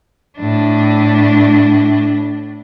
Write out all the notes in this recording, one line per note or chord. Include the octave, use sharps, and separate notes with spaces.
A2 D4